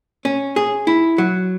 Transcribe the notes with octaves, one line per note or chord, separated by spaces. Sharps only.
C#4
G#4
E4
F#3